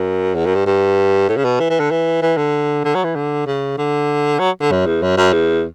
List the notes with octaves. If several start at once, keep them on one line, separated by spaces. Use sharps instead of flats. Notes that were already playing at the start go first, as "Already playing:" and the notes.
Already playing: F#2
E2
F#2
G2
G2
A2
C#3
B2
E3
E3
D3
E3
E3
D3
D3
F#3
E3
D3
C#3
D3
F#3
D3
F#2
E2
F#2
F#2
E2